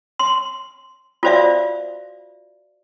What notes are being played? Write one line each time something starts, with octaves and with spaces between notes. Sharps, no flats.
C6
F4 F#4 C5 D5 E5 F5